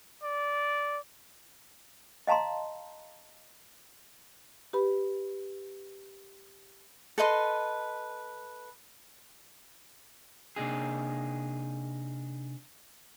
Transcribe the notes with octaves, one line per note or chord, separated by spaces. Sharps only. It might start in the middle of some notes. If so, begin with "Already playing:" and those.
D5
D#5 F5 A5 A#5 C6
G4 B4 B5
A4 B4 D#5 C6
C3 A#3 D4 D#4 G#4